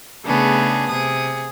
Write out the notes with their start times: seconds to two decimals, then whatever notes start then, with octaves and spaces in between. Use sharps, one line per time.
0.23 C#3 A3 B3 D4 G#4
0.90 C3 G#4 D#6